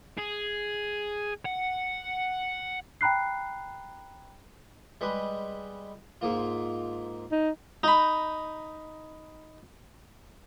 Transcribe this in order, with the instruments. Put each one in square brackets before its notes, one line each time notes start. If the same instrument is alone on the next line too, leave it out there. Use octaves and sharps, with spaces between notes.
[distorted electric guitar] G#4
F#5
[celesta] G5 A#5 B5 F#6 C7
[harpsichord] G3 G#3 B4
G#2 A#3 F4
[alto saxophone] D#4
[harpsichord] D#4 B5